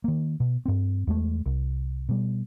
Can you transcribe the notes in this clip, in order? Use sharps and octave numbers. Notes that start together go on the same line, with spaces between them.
D#3 A#3
B2
G2 C4
E2 G#3 A3
C2
B2 G3